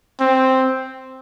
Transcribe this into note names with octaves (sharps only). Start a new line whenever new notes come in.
C4